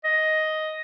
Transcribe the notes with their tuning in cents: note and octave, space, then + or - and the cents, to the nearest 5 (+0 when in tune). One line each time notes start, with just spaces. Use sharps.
D#5 +5